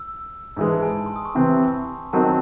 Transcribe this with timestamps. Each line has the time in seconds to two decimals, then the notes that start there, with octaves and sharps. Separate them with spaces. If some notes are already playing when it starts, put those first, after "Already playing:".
Already playing: E6
0.57 G#2 E3 G#3 G#5
0.70 A5
0.82 G#5
0.96 A5
1.06 C6
1.16 D#6
1.25 C#6
1.35 C3 E3 C4
2.13 D#3 F#3 C4 D#4 A5